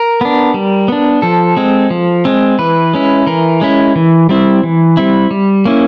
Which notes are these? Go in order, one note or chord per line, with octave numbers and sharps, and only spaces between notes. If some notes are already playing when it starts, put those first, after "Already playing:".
Already playing: A#4
B3 D4
G3
B3 D4
F3 A4
G#3 C4
F3
G#3 C4
E3 B4
G#3 C#4 E4
E3 A#4
G#3 C#4 E4
E3
G3 C4 E4
E3
G3 C4 E4
G3
A#3 C#4 E4